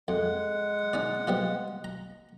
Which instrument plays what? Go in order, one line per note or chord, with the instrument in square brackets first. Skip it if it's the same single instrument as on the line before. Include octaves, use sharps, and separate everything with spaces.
[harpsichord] F2 [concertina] G#3 F#5
[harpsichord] C#4 D#4 D5
F3 G3 B3
A#5